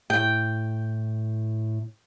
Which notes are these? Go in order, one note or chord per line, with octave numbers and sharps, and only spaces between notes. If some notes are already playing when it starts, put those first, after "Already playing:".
A2 G5